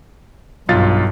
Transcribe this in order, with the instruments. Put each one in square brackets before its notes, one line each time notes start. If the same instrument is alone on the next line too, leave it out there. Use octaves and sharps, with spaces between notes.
[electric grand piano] B1 F4 A6 [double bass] G2